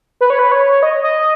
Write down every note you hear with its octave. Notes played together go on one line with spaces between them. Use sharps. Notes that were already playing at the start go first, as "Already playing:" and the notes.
B4
C#5
B4
C#5
D#5
D#5